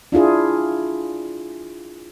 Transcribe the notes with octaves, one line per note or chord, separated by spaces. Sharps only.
D4 E4 F4 G#4